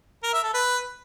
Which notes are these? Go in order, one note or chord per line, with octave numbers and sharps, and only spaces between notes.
A#4
E5
A4
B4